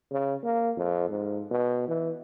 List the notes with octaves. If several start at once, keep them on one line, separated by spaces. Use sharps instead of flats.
C#3
A#3
F2
G#2
B2
E3